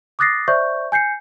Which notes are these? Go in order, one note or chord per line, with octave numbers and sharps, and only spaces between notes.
D6 D#6 F#6 A6 A#6 C7
C5 D5 E5 C#6 G6
G#5 G6 C7 C#7